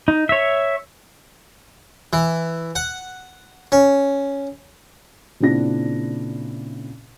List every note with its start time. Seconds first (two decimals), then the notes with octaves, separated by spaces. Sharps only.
0.08 D#4
0.29 C#5 E5
2.13 E3
2.75 F#5
3.72 C#4
5.40 A#2 C#3 C4 D4 E4 A#6